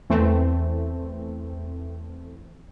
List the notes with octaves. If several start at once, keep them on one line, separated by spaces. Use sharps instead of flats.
E2 E3 A3 C4